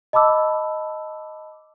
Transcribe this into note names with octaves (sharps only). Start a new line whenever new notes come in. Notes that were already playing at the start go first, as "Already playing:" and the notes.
D#5 A5 B5 D6 E6